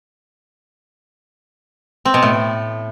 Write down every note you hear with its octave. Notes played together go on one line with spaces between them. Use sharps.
C4
B2
A2